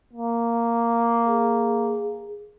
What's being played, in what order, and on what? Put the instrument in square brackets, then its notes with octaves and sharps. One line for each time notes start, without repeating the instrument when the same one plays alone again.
[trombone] A#3
[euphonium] G#4